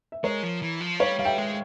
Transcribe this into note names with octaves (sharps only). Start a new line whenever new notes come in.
E5
G#3 A#4 C#5
F3
E3
F3
G3 C#5 F5
G3 F5
E5 G5
G#3